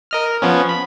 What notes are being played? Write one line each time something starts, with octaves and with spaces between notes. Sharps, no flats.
A#4 D#5 F6
A#4
F3 B3 C#4
B5